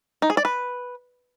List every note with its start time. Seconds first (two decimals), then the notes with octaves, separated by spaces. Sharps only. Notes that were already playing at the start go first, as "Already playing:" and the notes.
0.22 D#4
0.30 G#4
0.37 D5
0.45 B4